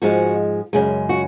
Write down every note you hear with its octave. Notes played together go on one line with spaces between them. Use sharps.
G#2 F3 G#3 F#4
F#2 C#3 G#3
F#4